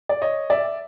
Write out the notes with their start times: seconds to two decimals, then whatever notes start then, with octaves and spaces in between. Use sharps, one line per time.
0.09 D5
0.22 C#5 D#5
0.50 D5 E5